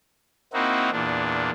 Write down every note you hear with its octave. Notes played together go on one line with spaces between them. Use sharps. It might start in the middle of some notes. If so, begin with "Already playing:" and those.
A#3 C4 D#4 E4 F#4
E2 A#2 D4